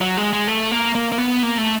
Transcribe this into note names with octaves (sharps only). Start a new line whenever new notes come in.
F#3
G#3
G#3
A3
A#3
A#3
A#3
B3
A#3
A3